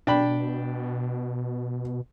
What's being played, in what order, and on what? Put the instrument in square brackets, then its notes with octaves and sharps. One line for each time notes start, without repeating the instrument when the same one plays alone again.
[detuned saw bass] B2 [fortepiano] D4 G5 B5